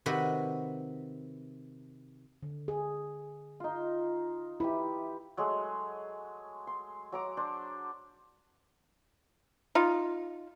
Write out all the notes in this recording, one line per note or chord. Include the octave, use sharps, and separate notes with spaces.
C3 D#3 F#4 B4
D3
G#4
D#4 F4
E4 G4 B4
F#3 G#3 A3 G#4
C6
F#3 A#5 D6
D4 C5
D#4 F4